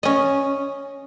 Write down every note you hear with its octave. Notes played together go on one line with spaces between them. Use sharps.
C#4 D#5